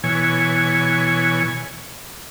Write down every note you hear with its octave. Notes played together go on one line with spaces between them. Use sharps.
B2 E3 C#5 G#5